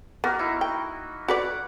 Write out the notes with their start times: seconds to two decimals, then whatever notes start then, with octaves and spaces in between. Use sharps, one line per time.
0.24 A#3 B3 F#4 A#4
0.39 D#4 E4
0.61 G5
1.28 F#4 B4 D5 F#5 D6